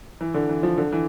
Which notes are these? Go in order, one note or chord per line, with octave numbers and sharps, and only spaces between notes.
E3
D3
E3
F3
D3
E3